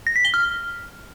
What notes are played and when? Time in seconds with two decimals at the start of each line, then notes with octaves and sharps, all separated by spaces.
0.07 A#6
0.16 B6
0.25 G7
0.34 F6